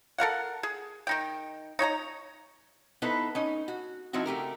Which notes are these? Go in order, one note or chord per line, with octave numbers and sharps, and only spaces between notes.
A4 A#4 F5 F#5
G#4
D#3 D#4 G5
D#4 C#5 G5 A#5
B3 D#4 E4 A4 B4 C5
C#4 D#4
F#4
F3 C4 D#4 E4 F#4
C#3 A3 G4 A#4